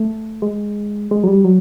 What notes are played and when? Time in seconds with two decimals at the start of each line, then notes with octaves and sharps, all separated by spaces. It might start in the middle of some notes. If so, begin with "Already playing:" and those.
Already playing: A3
0.42 G#3
1.11 G#3
1.24 F#3
1.27 G3
1.44 F#3